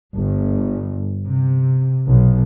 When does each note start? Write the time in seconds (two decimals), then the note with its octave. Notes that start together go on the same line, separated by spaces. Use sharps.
0.16 G1
1.25 C3
2.08 B1